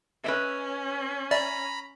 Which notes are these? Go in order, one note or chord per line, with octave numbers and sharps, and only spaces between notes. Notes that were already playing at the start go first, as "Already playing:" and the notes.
C#4 B4 D#5 E5
D5 E5 A#5 B5